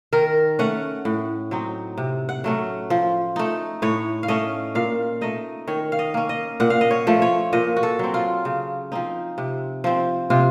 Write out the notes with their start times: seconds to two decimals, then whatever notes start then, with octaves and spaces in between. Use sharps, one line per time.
0.13 D#3 A#4
0.59 A3 C#4 F#5
1.05 A2
1.51 F#3 C4 D#4
1.98 C3
2.29 F#5
2.44 F#3 A3 C#4
2.90 F3
3.36 A3 D#4
3.82 A2 C#5
4.23 F5
4.28 A3 C#4 D#5
4.75 A#2 F5
5.21 A3 D#4 D#5
5.67 D#3 C#5
5.92 F5
5.99 D#5
6.14 A#3 C#4
6.29 D#5
6.60 A#2 F#5
6.70 F5
6.81 D#5
6.91 C#5
7.07 F3 A3
7.22 C#5
7.53 A#2 D#5
7.77 F#4
7.83 A4
7.99 F#3 C4
8.14 F4
8.45 C#3
8.92 F3 C4 D#4
9.38 C3
9.84 F3 C4
10.30 C3 F4